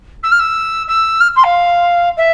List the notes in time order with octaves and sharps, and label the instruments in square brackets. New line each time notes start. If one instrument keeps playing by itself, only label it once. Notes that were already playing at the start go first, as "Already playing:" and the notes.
[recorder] E6
F6
E6
E6
F6
C6
F5
E5